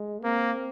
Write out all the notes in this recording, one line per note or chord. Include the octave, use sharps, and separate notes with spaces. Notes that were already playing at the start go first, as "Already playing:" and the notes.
Already playing: G#3
A#3 C4